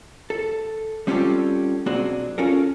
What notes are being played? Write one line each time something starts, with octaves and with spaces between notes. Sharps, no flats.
A4
G3 C4 C#4 F4 G4 A4
B1 A#3 C4 D4 F#4 G#4
C#4 F4 A4 A#4